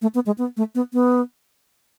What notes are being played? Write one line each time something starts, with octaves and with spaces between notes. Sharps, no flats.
A3
B3
G#3
B3
A3
B3
B3